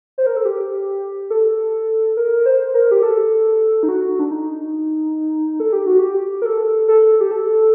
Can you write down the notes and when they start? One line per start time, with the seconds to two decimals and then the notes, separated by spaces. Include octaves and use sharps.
0.18 C5
0.26 A#4
0.36 A4
0.45 G4
1.30 A4
2.17 A#4
2.46 C5
2.74 A#4
2.91 G4
3.03 A4
3.83 D#4
3.89 F#4
4.19 D4
4.31 D#4
5.60 A4
5.73 G4
5.86 F#4
5.99 G4
6.42 A#4
6.45 A4
6.88 A4
7.21 G4
7.31 A4